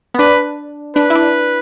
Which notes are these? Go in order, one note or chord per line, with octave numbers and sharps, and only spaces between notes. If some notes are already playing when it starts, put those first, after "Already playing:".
B3
D4 B4
D4 B4
E4
D4